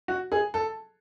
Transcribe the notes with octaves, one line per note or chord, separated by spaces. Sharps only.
F#4
G#4
A4